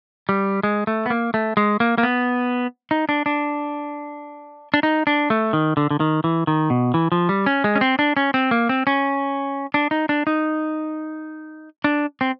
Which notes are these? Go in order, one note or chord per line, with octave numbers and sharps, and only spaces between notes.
G3
G#3
A3
B3
A#3
A3
G#3
A#3
A#3
B3
D#4
D4
D4
D4
D#4
D4
A3
D#3
D3
D3
D#3
E3
D#3
B2
E3
F3
G3
C#4
G#3
C#4
C4
D4
C#4
C4
A#3
C4
C#4
D4
D#4
D4
D#4
D4
C4